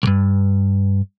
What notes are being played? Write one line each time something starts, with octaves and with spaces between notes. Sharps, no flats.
B1 G2